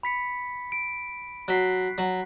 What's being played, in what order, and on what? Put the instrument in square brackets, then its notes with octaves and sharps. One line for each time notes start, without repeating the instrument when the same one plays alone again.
[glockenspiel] B5 B6 C#7
D7
[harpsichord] F#3 [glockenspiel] F#6 B6 C7
[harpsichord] F#3